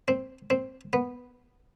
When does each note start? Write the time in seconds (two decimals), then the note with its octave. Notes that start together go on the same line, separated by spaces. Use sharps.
0.08 C4
0.50 C4
0.93 B3